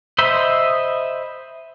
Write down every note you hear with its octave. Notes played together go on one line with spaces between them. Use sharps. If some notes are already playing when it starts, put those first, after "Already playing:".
C5 D#5 E5 B5 C6